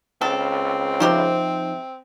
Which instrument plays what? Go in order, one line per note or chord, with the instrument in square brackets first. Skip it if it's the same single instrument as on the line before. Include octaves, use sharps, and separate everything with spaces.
[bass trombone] C#2 [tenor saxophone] C4 [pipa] A4
[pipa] C3 G4 C5 [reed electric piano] F3 D#4